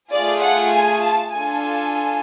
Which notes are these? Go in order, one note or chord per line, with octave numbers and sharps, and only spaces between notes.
A3 F4 G#4 D5
F#5
G#5
A5
D4 F4 A4 G#5